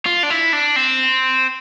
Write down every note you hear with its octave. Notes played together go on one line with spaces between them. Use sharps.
F4
D4
E4
D4
C4